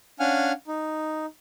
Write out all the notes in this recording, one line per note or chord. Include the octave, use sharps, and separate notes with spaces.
C#4 D4 F5 F#5 G#5 F6
D#4